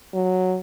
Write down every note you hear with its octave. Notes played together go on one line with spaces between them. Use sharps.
F#3